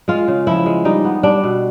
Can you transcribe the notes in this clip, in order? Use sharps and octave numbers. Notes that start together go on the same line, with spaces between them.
G#3 F4
C#3
F3 E4
G#3
G3 D#4
B3
G3 D4
B2